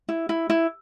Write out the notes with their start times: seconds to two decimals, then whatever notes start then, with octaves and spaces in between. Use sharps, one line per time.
0.09 E4
0.29 E4
0.50 E4